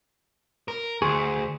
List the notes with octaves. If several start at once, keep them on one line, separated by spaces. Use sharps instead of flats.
A#4
D2 G#4 C6 C#6